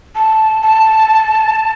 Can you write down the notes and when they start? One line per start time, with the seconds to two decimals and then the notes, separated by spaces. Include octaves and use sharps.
0.15 A5
0.62 A5